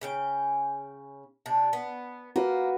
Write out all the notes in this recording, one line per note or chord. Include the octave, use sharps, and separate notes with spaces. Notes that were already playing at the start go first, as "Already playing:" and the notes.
C#3 C#4 G5
C3 D4
B3
A#3 F#4 B4 F5